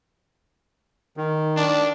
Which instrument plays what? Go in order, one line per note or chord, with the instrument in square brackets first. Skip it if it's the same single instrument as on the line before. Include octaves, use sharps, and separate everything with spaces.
[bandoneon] D#3
[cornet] D4